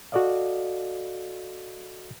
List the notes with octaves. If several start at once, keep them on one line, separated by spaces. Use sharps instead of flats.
F#4 A4 D5 D#5 F5